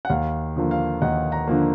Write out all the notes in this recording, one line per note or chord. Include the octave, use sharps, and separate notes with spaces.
F#5
D#2 F5
D3 F3 A#3
F5
D#2 D#5 F#5
F#5 A#5
D3 F3 A#3